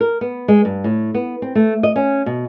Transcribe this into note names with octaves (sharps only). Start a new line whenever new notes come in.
A#4
B3
G#3
G2
A2
B3
C4
A3
D#5
C#4
B2